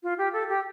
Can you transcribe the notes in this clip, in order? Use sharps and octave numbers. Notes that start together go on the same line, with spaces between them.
F4
G4
A4
G4